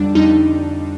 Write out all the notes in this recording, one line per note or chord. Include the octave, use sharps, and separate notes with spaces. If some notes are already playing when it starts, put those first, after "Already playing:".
Already playing: F2 D3 G3 D4
F2 D3 G3 D#4